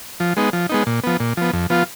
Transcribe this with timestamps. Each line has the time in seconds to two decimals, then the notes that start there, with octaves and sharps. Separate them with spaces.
0.20 F3
0.36 G#3 B3 D#4
0.53 F3
0.69 G#3 B3 D#4
0.87 A#2
1.04 F3 B3
1.20 A#2
1.37 F3 B3
1.53 F2
1.70 F3 B3 F4